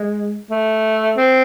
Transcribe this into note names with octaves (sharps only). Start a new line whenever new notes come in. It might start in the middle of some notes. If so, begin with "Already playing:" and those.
Already playing: G#3
A3
C4